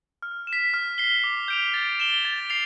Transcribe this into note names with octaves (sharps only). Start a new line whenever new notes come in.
F6
E7
B6
F6
C7 G7
D6
G6 D7 F7
A6
E7 G7
A6
C7 F7